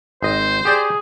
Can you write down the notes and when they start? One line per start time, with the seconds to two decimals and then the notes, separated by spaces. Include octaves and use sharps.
0.23 G#1 C5 D#5
0.65 G4 G#4 D5